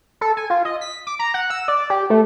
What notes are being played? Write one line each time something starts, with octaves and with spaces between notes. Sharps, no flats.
A4
G#5
F4
D#5
B6
D6
A#5
F#5
E6
D5
G4
A3